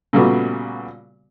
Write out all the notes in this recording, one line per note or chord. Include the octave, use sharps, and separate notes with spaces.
A#2 C#3 G3 A3 B3 F#4